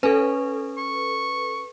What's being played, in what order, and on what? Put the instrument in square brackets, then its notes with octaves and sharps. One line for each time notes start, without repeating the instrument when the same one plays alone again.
[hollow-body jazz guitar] C#4 [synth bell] A4 B4
[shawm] C#6